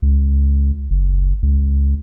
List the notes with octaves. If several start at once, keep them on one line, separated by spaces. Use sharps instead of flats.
C#2
F#1
C#2